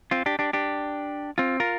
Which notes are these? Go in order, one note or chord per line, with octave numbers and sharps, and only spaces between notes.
C4 F4
D4 G4
D4 G4
D4 G4
C4 F4
F4 A#4